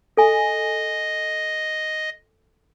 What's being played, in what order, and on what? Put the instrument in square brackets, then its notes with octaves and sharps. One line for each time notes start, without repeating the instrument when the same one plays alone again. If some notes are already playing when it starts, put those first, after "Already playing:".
[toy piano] A4 G#5 [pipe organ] D#5